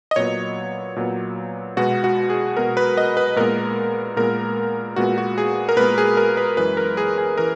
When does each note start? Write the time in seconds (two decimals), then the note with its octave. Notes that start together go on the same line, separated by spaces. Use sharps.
0.11 D#5
0.16 A#2 F#3 B3 C#5
0.96 A#2 F#3 B3
1.77 B2 G#3 B3 F#4
2.04 F#4
2.30 G#4
2.57 B2 G#3 B3 A#4
2.77 B4
2.97 D#5
3.17 B4
3.36 A#2 G#3 B3 A#4
4.16 A#2 G#3 B3 A#4
4.96 A#2 G#3 B3 F#4
5.18 F#4
5.38 G#4
5.69 A#4
5.76 A#2 G#3 B3 B4
5.98 G#4
6.17 A#4
6.37 B4
6.57 F#2 E3 G#3 B4
6.77 A#4
6.97 G#4
7.18 G#4
7.38 E3 A#4